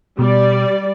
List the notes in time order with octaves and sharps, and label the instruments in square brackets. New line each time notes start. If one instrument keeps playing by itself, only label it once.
[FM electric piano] B2 [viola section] G3 D5